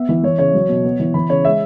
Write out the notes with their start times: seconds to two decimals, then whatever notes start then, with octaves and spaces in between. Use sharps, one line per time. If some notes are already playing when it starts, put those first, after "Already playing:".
Already playing: B3 E5
0.09 E3
0.23 E3 C#5
0.39 C#3 C#5
0.54 F#3
0.68 B2
0.84 B3
1.00 E3
1.14 E3 B5
1.29 C#3 C#5
1.45 G#3 E5